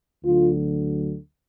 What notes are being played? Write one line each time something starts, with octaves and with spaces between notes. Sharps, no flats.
D2 D3 F#3 F4